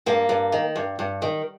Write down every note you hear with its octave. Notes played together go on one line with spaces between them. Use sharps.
G2 A#3
G2
D#3
G2
G2
D#3